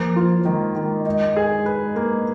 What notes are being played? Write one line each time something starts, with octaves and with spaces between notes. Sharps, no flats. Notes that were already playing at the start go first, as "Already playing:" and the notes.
Already playing: F3 A#3
F4
D#3 G#3
D#3
G#3 D#4
G#4
B4
A#3